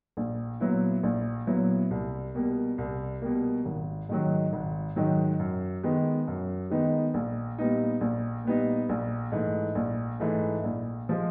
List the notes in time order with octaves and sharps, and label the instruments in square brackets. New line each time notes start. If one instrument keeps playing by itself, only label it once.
[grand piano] A#1
A#2 F#3 B3 E4
A#1
A#2 F#3 B3 E4
C2
B2 G3 A#3
C2
B2 G3 A#3
G#1
G#2 D#3 F#3
G#1
G#2 D#3 F#3
F#2
D#3 G#3 B3 D#4
F#2
D#3 G#3 B3 D#4
A#1
A#2 G3 B3 D#4
A#1
A#2 G3 B3 D#4
A#1
G#2 E3 A3
A#1
G#2 E3 A3
A#1
F3 G#3